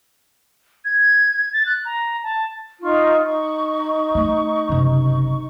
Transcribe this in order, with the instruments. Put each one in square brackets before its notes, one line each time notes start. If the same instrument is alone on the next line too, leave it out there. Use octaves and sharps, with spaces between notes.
[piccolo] G#6
A6
F#6
A#5
A5
[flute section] D#4 F4 C#6
D#4 C#6
[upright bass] A3
F#1 C3